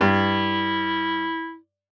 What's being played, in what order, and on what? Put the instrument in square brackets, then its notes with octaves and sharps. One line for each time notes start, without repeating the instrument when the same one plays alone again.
[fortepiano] G2 [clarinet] E4